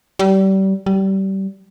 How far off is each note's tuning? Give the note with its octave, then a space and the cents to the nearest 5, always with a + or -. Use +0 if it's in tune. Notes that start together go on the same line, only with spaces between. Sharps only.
G3 -30
G3 -25